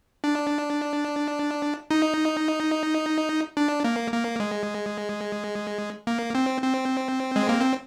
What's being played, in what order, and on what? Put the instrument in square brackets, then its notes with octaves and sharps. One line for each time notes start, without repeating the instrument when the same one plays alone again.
[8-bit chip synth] D4
D#4
D4
A#3
A#3
G#3
A#3
C4
C4
G#3
A#3
C4